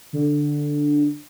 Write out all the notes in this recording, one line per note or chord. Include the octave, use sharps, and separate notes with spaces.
D3